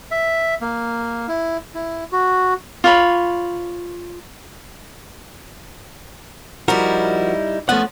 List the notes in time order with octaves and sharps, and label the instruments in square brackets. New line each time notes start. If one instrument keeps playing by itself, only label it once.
[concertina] E5
A#3
E4
E4
F#4
[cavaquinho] F4 C#5 B5
[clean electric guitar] F3 F#4 A#4 [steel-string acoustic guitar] G3 D#4 E4
[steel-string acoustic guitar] F3 B3 C#4 [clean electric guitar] A3 F#5